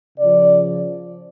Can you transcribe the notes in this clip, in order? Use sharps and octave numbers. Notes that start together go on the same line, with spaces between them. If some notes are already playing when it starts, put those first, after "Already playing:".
C#3 F3 D5